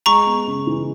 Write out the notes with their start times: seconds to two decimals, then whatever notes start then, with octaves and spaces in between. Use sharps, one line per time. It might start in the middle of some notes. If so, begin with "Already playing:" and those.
0.06 G#3 A#5 C#6
0.26 B3
0.47 C#3
0.67 E3